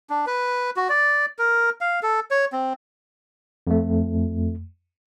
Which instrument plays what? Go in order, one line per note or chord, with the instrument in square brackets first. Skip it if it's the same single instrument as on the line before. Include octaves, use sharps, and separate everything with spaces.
[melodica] D4
B4
F#4
D5
A#4
F5
A4
C#5
C4
[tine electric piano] F2 A3